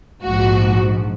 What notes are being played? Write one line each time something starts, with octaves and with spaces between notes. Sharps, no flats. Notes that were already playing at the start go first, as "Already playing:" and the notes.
A#1 G#2 F3 F#4